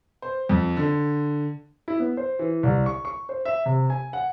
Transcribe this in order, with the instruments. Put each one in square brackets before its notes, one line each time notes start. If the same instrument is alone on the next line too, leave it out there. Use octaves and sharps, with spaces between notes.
[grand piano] C5
F2
D3
E4
B3
C5
E3
C2
C#6
C#6
C5
E5
C3
G#5
F#5